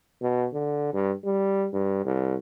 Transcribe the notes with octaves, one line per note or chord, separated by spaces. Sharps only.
B2
D3
G2
G3
G2
C2